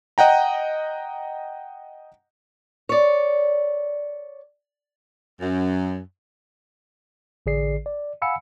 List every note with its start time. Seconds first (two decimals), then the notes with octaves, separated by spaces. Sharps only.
0.18 D#5 F#5 G5 A#5
2.89 C#5 D5
5.41 F#2
7.46 A1 D3 G#4 D5 C7
7.86 D5
8.22 F5 F#5 G#5 B5 E6 C#7